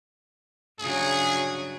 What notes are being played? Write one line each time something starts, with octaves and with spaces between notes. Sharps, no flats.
G2 C#3 F#3 G#4